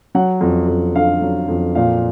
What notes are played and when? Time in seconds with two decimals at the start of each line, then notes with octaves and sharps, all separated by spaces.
0.15 F#3 F#5
0.41 F2
0.68 F2
0.95 D3 F5
1.22 F#3
1.49 F2
1.75 A#2 F5